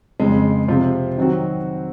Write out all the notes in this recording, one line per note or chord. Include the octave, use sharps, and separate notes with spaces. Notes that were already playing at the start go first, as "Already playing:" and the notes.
F2 C#3 G#3
C3 F3 C4 F4
D#3 F#3 C4 F#4